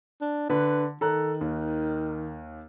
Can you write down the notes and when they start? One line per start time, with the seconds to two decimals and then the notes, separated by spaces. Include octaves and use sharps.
0.21 D4
0.50 D3 B4
1.01 D#3 A4 A#5 F#6
1.41 D#2